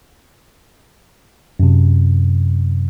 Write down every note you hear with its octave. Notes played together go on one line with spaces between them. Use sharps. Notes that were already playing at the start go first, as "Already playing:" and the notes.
F#2 C3